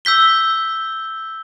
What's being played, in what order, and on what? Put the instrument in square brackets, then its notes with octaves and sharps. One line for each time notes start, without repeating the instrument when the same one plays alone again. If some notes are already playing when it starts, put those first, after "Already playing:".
[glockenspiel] E6 G6 B6 G7